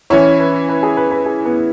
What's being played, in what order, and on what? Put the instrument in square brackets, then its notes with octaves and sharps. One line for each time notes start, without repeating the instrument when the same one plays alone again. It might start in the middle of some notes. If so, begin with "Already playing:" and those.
[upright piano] E3 C#4 E4 [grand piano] C#5
[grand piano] B4
B4
G#4
B4
B4
G#4
B3